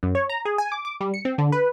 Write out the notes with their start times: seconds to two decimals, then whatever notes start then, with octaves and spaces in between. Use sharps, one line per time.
0.03 F#2
0.15 C#5
0.29 A#5
0.45 G#4
0.58 G#5
0.72 D6
0.85 D6
1.01 G3
1.14 C#7
1.25 C4
1.38 D3
1.52 B4